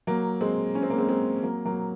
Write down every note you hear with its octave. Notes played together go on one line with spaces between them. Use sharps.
F#3 A#3
G#3 C4
C#4
C4
A#3
G#3 C4
G#3 C4
F#3 A#3
F#3 A#3